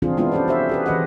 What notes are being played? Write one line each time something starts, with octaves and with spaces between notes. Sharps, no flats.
E3 C4 D4 F4 G#4
G#3 B3 D4 E4 F4
C#4 G4 A4 C5 D5
F#4 C5 E5
G4 G#4 B4
E3 B4 D#5 F#5